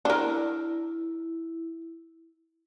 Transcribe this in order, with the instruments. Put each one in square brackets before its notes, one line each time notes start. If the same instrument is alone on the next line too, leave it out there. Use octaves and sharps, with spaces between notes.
[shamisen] D4 A#4 [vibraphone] E4